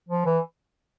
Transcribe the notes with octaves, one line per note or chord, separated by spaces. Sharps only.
F3
E3